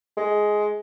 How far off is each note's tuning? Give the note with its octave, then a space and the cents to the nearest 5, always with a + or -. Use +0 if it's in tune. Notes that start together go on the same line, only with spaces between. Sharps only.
G#3 +10